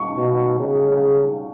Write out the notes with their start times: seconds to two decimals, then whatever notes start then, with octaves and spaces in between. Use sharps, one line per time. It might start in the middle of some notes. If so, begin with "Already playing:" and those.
Already playing: C#6
0.16 B2
0.59 C#3
0.88 C#3